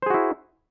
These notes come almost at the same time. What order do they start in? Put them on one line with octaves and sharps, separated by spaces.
C5 G#4 F#4 E4